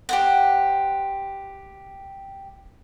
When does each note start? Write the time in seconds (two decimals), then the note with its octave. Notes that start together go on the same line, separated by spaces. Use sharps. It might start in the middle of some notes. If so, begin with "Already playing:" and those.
0.09 G4 C5 F#5